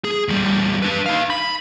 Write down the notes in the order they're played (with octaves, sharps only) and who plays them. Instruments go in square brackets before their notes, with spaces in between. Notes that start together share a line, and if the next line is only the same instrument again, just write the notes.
[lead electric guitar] G#4
E2 G3
D4 B4
D#4 F5
B5